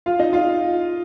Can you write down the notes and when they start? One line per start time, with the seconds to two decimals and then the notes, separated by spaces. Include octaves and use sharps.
0.06 F4 F5
0.19 D#4 D#5
0.33 F4 F5